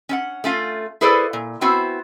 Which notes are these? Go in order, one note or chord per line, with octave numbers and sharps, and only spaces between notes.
C#4 D4 F#5
A3 C#4 F4 F5
E4 G#4 A4 B4 C5 D5
A#2
B3 C4 E4 F#4 C5